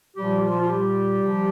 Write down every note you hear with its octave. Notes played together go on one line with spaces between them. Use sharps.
A#2 F3 G3 G4
F3 F4
F4
G3 G4
C3 F3